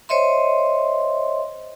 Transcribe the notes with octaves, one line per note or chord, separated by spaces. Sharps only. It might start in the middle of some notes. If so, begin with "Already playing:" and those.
C5 C#5 D#5 E5 C6